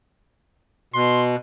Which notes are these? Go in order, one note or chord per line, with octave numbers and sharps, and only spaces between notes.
B2 C6